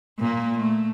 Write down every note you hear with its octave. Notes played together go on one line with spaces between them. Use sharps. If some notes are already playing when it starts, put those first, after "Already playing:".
A#2 A#3
A3